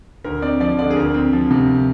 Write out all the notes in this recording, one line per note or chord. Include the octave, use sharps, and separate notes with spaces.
D2 A#4
C4 D5
F3 D5
D3 D5
G#4
D2 A#4
C4
F3
C3